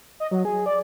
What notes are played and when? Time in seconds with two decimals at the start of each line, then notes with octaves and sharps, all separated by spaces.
0.20 D#5
0.31 F#3
0.45 G#4
0.66 D5